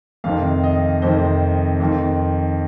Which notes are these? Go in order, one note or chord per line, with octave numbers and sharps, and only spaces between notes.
F2 C3 D#3 F5
D#5
F2 C3 D#3 C5
F2 D#3